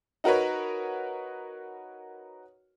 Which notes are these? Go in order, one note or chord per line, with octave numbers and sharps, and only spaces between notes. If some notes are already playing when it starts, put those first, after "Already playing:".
D#4 F#4 A#4 B4 C#5